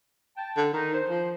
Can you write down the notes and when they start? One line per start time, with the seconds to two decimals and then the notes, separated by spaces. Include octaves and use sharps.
0.37 G5 A5
0.57 D3
0.73 D#3 D#4
0.93 C5
1.10 F3